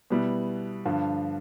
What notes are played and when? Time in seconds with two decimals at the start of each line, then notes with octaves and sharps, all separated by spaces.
0.10 B2 G3 B3 E4
0.86 G2 D3 F3